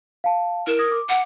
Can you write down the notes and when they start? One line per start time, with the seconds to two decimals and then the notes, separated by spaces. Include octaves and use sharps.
0.24 F5 A5
0.67 E4 A#4 E7
0.79 D#6 G#6 A#6
0.92 D6
1.09 F#5